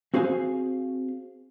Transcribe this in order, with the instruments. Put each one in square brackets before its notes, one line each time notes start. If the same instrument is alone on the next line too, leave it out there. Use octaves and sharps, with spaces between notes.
[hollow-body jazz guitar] C4 F#4 G#4 C5 F5 G#5